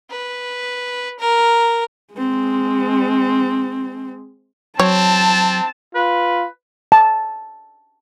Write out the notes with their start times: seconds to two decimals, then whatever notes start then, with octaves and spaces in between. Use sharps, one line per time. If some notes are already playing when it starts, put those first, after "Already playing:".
0.10 B4
1.19 A#4
2.14 G#3 C4
4.80 F#3 C4 C#5 A5
5.95 F4 B4
6.92 A5